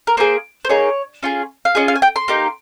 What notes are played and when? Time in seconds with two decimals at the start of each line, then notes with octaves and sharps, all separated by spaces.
0.07 A#4
0.17 A#3 D#4 G#4 C5
0.65 C5
0.69 A#3 D#4 G#4 C#5
1.23 C#4 F4 G#4
1.65 F5
1.75 C#4 F4 G#4 D#5
1.88 F5
1.96 G#5
2.02 G5
2.16 C6
2.28 A#3 D#4 G4